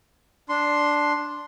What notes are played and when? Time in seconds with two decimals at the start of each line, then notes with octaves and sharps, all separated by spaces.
0.49 D4 C6